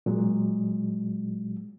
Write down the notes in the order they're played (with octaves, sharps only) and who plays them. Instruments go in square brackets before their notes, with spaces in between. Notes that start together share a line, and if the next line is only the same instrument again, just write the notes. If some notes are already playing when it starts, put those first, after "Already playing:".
[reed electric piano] A#2 F#3 G#3